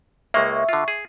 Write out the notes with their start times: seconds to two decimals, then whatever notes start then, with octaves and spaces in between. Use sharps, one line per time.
0.34 C#2 G#3 A#3 E5 C#6
0.69 D3 F4
0.88 G#4